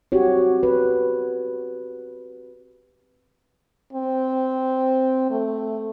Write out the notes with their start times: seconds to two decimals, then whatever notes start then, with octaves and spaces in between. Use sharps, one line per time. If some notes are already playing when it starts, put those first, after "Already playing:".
0.12 C4 F#4 G4 C#5
0.63 B4
3.93 C4
5.30 A3